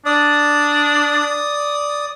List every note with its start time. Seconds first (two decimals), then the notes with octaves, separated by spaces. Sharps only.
0.06 D4 D5 D#6